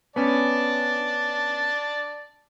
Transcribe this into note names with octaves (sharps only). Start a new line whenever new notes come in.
B3 C#4 D5 A5